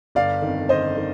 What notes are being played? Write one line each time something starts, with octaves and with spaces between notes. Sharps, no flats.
G1 D5 F5
F2 D#3
G1 C5 D#5
D#3